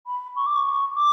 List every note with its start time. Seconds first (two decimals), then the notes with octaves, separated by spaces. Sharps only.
0.07 B5
0.36 C#6
0.46 D6
0.56 C#6
0.95 D6